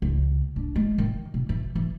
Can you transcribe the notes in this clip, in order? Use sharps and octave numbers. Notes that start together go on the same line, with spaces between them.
C#2
D4
G#3
D#3
B2
E3
E3